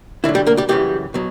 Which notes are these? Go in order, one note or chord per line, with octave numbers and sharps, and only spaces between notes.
D2 D3 E3 F#3 E4
G3 G4
A#3 A#4
G3 G4
F#2 C#3 E3 G3 G4
B2 F#3